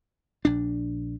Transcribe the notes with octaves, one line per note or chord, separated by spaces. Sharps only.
A#1 D4